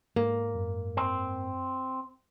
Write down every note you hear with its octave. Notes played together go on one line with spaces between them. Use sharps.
G#2 A#3
F#2
C4